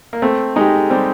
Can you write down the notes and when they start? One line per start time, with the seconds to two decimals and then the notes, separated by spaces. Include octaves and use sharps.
0.13 A#3
0.22 A3 C4
0.56 G#3 D#4 G4
0.90 G3 C4